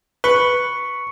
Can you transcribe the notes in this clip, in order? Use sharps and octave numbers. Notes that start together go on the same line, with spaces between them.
B4 C#6 C#7